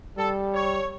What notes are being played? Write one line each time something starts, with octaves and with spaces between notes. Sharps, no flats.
G3 A4
C#5